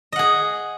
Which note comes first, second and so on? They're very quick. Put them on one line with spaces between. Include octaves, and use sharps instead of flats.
D#5 F#5 G#4